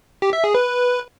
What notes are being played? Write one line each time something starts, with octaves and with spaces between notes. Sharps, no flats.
G4
E5
G#4
B4